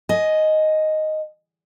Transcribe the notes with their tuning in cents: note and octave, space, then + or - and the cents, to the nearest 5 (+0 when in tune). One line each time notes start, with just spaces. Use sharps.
D#5 +0 G#5 +20